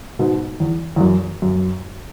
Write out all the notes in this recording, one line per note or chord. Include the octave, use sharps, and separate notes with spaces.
G#2 B2
E2
E2
F#2
F#2